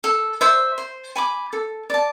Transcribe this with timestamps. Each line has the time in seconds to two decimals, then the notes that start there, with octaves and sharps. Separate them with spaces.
0.04 A4
0.41 C5 E5
0.78 C5
1.16 G#5 B5 D6
1.53 A4
1.90 D5 A5